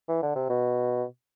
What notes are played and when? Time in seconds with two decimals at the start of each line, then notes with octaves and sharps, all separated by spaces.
0.08 E3
0.23 D3
0.36 C3
0.50 B2